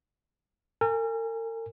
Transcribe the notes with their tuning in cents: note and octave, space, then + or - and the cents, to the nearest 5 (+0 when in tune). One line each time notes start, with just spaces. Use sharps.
A#4 -45 G#5 -20